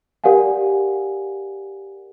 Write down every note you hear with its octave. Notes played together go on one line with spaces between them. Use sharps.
G4 A#4 D5 F5 F#5 G#5